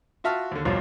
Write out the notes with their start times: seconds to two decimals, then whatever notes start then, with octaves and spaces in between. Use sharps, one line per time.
0.24 F4 F#4 E5 A5 F6
0.52 D#2 D3
0.65 F#1 B1 G2 B2 F3 F#3